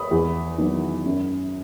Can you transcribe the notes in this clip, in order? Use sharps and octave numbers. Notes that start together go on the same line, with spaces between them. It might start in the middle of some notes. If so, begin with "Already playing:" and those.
Already playing: B5 D#6
E2
D#3 F#3 B3
F#2